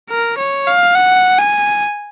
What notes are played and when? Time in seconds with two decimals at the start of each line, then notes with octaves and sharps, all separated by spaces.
0.10 A#4
0.38 C#5
0.67 F5
0.95 F#5
1.38 G#5